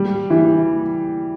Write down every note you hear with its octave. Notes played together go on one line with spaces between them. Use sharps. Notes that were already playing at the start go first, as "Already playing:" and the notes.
Already playing: G3
E3